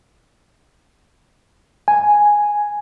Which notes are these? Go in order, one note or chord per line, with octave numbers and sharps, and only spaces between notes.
G#5